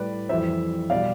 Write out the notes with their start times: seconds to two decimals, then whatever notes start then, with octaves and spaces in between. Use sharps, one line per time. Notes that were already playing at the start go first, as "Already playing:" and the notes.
Already playing: A2 G3 B4 D5
0.29 F2 E3 G3 C5 E5
0.90 B2 G3 D5 F5